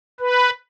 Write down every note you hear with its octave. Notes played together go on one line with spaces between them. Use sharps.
B4